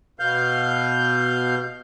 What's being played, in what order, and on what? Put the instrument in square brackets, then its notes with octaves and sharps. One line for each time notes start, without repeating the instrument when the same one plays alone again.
[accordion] B2 F5 G6